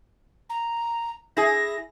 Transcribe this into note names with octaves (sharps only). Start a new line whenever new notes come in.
A#5
E4 G#4 A#6